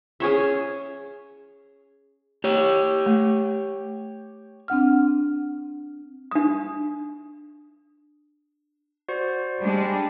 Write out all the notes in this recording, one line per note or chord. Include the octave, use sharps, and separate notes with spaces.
C#4 G#4 C#5 E5
G4 C#5
A3
C4 D4 F#5 F6
D4 D#6
F#4 C5 D5
G3 G#3 D4